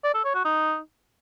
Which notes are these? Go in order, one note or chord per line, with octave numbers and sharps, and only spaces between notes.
D5
A4
C#5
F#4
D#4